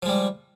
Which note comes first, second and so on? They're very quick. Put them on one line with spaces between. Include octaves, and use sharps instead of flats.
F3 G#3 G3